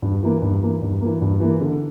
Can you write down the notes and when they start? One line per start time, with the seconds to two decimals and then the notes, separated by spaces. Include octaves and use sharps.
0.02 G2
0.23 E3 A#3
0.42 G2
0.63 E3 A#3
0.82 G2
1.01 E3 A#3
1.22 G2
1.40 E3 A#3
1.61 D3